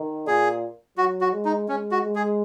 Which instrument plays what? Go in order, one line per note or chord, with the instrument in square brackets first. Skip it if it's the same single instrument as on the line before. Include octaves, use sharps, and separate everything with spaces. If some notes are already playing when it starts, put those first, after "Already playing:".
Already playing: [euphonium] D#3
[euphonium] A#2 [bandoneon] G#4
[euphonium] F#3 [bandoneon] F#4
[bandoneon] F#4
[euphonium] G#3
[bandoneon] D#4
[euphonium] G#3 [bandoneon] C#4
[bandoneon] F#4
[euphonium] G#3
[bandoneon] G#4